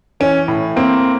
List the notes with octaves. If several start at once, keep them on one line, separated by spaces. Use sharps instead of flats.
E3 C#4
A2
A#3 C4